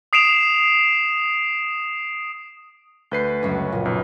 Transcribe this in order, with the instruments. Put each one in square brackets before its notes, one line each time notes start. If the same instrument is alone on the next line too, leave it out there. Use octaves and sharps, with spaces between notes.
[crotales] D#6 C7 D7 E7 F7
[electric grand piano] D2 B4 C7 [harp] G6
[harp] C#2 F#2
A#1 A#2
[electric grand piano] B1 [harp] B3